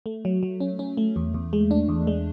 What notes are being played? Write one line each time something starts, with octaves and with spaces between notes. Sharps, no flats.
A3
F#3
F#3
C#4
C#4
A3
E2
E2
G#3
D4
E2
G#3